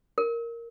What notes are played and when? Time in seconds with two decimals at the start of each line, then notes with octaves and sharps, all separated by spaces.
0.18 A#4